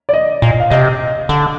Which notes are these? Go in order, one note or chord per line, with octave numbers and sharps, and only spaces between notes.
D5
D#5
A#2
F5
C3 D#5
D3